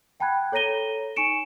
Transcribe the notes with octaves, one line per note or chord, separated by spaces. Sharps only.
F#5 G5 A5 B5 F#6 G#6
A4 C#5 A#5 A#6 D#7 G7
D#4 G#5 C#6 C#7 D7 E7